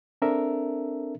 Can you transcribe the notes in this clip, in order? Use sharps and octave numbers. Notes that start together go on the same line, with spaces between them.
C4 D4 A4 A#4 E5